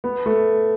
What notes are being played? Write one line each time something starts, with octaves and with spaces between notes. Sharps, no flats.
B3
A3